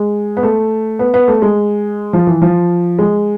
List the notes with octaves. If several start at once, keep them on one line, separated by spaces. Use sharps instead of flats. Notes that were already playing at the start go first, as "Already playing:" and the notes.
Already playing: G#3
B3
A3
B3
B3
A3
G#3
F3
E3
F3
G#3